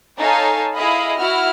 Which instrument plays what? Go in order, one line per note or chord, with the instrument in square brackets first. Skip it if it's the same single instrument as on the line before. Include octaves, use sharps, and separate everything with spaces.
[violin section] D#4 A4 C#5 F5 G#5 A5
E4 G#4 D#5 F5 B5
E4 F#4 F#5 F6